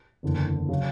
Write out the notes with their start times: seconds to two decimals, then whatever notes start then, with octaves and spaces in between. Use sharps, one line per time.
0.23 F#1 E2 D3
0.69 C#3 F#3